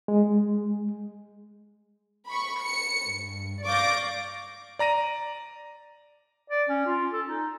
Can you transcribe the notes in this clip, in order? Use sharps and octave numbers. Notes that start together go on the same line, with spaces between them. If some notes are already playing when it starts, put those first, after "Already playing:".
G#3
B5 C#6
C#7
G2
D5 F5 C#6 D6 G6 A#6
D5 A#5 A#6 D#7
D5
C#4
F4
A4
D#4